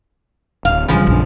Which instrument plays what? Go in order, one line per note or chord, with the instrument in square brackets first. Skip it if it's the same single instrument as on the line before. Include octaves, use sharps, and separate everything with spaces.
[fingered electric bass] D1 [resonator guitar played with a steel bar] F5
[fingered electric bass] A1 G2 [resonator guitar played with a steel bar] C#3 F3 G#3
[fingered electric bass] A#1 F#2 D4